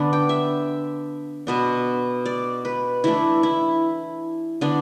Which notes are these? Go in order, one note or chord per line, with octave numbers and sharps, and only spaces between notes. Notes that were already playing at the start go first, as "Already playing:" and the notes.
Already playing: D3 B3 D4
G5
E5
B2 B3 D4
D5
B4
E3 A3 D4 E4
E4
D3 B3 D4